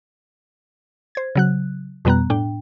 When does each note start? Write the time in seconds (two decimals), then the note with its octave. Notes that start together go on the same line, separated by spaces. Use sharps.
1.15 C5 G#6
1.35 C#3 F#3 F#6
2.05 F2 B2 G3 B3 A#5 F#6
2.30 A2 D4 G5